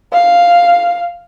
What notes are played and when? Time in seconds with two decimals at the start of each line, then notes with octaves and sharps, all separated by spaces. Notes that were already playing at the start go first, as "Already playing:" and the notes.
0.13 F5